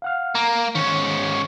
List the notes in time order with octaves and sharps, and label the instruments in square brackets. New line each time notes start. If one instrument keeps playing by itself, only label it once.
[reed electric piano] F5 F#5 F6
[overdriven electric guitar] A#3 [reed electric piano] A#5
[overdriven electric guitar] G#2 C#4 [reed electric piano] D#3